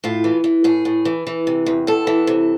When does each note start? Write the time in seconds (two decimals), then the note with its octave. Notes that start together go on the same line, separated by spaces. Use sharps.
0.04 A2 F4
0.24 E3
0.44 E3
0.64 A2 G#4
0.85 A2
1.05 E3
1.27 E3
1.47 C3
1.66 E2
1.87 E2 A4
2.07 E3
2.27 C3